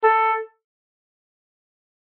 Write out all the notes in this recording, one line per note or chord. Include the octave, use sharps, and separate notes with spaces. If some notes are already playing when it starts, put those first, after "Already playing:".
A4